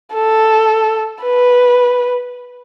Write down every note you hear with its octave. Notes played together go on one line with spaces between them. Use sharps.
A4
B4